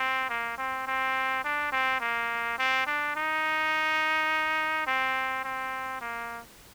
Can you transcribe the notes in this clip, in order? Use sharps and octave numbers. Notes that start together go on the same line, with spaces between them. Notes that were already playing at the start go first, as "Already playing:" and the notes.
Already playing: C4
A#3
C4
C4
D4
C4
A#3
C4
D4
D#4
C4
C4
A#3